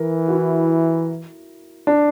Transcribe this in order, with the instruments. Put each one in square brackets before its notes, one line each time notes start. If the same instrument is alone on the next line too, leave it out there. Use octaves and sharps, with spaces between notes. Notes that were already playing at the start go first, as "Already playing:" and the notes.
Already playing: [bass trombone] E3 [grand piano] A#4
[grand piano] F#4
E4
D4